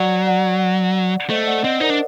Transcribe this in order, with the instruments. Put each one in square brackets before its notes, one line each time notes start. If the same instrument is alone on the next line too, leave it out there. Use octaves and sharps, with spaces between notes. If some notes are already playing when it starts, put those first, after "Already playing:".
Already playing: [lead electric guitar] F#3 [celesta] D5 F#5
[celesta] D5 F#5
[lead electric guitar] A3 [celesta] C5 D#5
[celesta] D5 F#5
[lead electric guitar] C4 [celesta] C5 D#5
[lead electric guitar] D#4 [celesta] A#4 D5
[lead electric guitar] D4